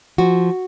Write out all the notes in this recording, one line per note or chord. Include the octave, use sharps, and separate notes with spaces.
F3 F#4